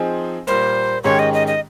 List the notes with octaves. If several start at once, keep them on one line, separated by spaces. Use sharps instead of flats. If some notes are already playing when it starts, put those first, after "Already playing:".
Already playing: F3 C4 D#4 G#4
A#2 G3 A#3 C5
G#2 D#3 G#3 C#4 G4 C#5
D#5
D#5
D#5